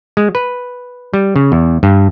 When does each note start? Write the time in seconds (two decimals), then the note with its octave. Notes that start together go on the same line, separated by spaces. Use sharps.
0.17 G#3
0.35 B4
1.14 G3
1.36 C#3
1.52 E2
1.83 G2